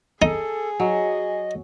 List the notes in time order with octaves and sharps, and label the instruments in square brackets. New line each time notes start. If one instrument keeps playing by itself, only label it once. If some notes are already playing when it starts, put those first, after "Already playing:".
[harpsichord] D#4 [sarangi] G#4 [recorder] A4
[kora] F#3 [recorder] D#5